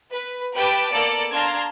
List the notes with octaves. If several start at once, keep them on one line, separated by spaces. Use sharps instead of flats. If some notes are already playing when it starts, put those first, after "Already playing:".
B4
G4 B4 G5 A5 D6
A#3 B3 A4 D5
D4 F5 A5 A#5 C6 G#6